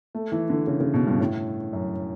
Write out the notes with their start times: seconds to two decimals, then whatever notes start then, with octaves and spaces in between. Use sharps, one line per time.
0.15 A3
0.32 E3
0.50 D3
0.67 C#3
0.80 C#3
0.94 B2
1.07 G2
1.20 A2
1.73 F#2